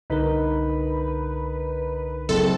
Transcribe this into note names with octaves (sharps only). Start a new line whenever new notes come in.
C2 D3 D#4 A#4 B4
F#1 C4 A4